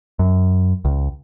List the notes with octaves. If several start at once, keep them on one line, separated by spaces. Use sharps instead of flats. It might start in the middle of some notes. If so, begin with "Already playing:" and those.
F#2
C#2